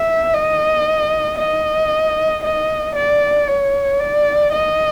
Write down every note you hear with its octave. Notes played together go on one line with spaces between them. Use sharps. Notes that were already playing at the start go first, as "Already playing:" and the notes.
Already playing: E5
D#5
D#5
D#5
D5
C#5
D5
D#5